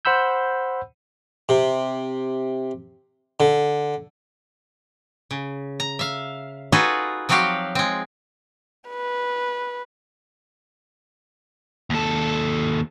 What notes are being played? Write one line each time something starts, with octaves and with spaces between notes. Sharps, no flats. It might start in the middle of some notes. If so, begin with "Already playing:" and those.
C5 F#5 B5 E6 G6
C3
D3
C#3
A#5
E5 F5
D#4 F4 F#4 G#4 A4 B4
F3 F#3 C4 F#4 G4 F5
G#3 C4
B4
D#2 A4